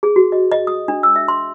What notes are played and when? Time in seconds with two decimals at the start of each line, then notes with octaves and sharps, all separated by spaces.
0.03 G#4
0.16 F#4
0.32 D#5
0.51 D#5
0.67 D#6
0.88 D4
1.03 E6
1.16 E5
1.28 C6